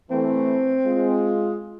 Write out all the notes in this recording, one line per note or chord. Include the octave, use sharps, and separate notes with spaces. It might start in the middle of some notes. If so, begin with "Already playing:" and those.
E3 A3 C4
G#3 F4